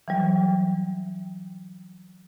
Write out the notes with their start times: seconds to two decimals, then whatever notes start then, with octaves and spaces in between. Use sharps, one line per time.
0.08 E3 F#3 G3